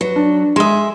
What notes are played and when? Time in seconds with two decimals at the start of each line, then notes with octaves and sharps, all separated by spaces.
0.01 F#3 B4
0.16 D4
0.56 G#3 E5 C6 D#6